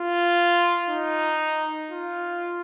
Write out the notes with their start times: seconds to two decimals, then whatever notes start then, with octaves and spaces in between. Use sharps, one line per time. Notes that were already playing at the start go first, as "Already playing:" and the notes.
Already playing: F4
0.90 D#4
1.90 F4